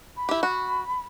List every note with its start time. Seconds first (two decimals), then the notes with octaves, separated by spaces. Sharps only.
0.17 B5
0.29 E4 G4
0.43 F#4